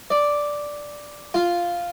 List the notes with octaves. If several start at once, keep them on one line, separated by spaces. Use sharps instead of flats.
D5
F4